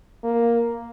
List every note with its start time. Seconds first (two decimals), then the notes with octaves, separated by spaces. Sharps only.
0.23 A#3